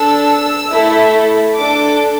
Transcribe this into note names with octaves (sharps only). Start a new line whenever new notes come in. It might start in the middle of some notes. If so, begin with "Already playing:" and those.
Already playing: D4 A4 E6
A3 E4 A4
D4 A4 D6